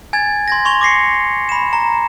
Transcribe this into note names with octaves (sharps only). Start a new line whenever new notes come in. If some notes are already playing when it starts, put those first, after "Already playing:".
G#5 G#6 A6
C6 G#6 A#6
C6 C#6 F7 G7
D6 A#6 C7 C#7
B5 E7
A#5